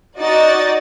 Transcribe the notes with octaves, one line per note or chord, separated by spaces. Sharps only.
D#4 F#4 D5 D#5 A6